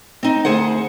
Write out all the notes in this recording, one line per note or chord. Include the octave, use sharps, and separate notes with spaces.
C4 D#4
D2 G#4 C5 F#5